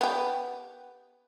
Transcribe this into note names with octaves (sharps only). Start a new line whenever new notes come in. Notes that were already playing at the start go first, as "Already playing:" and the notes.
B3 G4